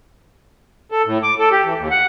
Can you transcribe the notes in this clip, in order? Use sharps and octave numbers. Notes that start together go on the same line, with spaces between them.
A4
A2
D6
A4
G4
E3
D#2
F#5